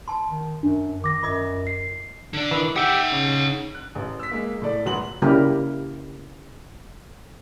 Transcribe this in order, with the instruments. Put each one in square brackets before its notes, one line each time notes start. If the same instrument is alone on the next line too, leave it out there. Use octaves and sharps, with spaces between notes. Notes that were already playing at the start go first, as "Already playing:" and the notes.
[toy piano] A5 C6
[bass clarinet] D#3
[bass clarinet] F#2 [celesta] D4
[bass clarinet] D#3 [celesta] D6 A#6
[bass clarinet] F#2 [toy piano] F4 D#5 D#6
[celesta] C7
[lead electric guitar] D3 D4
[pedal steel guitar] D#3 E3
[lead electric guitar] D#4 F#5 [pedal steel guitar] G4 E5 G5
[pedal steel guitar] C#3
[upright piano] F#6
A1
E6 B6
G#3 A#3
A2 A4 D5
E1 G2 F#4 C6 F#7
[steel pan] C#3 G3 A#3 E4 G4 A#4